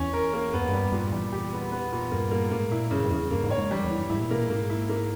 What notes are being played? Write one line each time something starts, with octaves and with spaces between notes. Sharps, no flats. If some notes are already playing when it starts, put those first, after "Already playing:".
Already playing: E2 C#4
A#4
A#3
G2 B3
E2
G2 G3
G2 A#2
E2 G3
G4
B3
B3
A#2
G2 A#3
A#3
G#2 A#3
A#2 E4
G2 C#3
G2
E2 C#3
G2 A#3
G#2
C#5
G#2
E2 G3
E2
E3
G2
G#2 E4
A#2
B2 A#3
A#2
G#2 A#3
E4
A#3